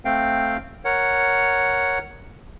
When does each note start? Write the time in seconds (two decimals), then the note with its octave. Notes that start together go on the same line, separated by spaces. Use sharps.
0.05 A3 C4 F5 G5
0.85 A#4 C#5 F#5